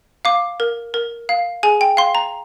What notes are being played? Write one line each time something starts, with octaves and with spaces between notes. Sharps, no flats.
F5 D6
A#4
A#4
F5
G#4 G#5
G5
F5 C6
A#5